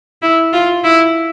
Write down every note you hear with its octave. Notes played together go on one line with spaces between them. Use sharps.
E4
F4
E4